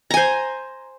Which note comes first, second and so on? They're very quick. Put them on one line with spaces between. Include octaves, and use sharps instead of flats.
A#5 G#5 C5